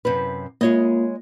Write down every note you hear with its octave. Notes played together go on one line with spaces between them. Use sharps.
F#2 C3 B4
G#3 A#3 F4 C#5 D#5